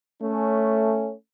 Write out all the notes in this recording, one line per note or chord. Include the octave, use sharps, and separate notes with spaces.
A3 C#4